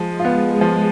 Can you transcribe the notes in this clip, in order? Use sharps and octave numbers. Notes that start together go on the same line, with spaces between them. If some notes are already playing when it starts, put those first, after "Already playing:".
Already playing: F3 G#3
F4
B3
F3